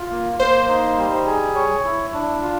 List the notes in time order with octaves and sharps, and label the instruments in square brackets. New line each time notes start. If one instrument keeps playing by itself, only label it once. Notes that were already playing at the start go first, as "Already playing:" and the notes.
Already playing: [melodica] F4
A#3
[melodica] A#3 [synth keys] C5
[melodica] D#4
G3
G#4
C#5
E4
D4
F4